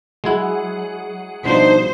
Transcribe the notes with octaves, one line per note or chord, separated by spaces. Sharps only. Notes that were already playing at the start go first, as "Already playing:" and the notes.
F#3 G#3 E4 G#4 F#5
G2 B2 F3 D4 D#4 C5